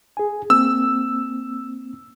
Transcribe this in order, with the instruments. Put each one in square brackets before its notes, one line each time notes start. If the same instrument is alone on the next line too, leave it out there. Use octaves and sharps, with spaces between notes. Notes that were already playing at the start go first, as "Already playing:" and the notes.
[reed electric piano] G#4 G#5
[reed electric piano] A#3 C4 [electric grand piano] E6